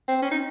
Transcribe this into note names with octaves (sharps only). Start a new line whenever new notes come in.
C4
C#4
D#4